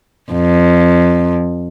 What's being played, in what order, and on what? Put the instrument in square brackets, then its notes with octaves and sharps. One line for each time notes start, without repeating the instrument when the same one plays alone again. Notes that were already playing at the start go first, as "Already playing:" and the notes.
[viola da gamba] F2